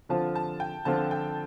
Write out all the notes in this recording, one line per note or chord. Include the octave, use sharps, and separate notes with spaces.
D3 F3 C4 F4 A5
A5
G5
D3 F3 C4 F4 A5
G5